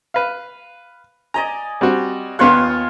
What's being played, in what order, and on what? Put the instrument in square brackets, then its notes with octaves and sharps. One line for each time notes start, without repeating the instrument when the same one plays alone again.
[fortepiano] B4 F5
[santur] D5 D#5 G#5 [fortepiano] A#5
[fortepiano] G3 C4 F#4
[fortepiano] D#2 B3 F#6 [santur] F4 C#5 F5